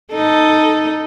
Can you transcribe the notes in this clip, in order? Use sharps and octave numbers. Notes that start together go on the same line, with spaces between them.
D#4 A4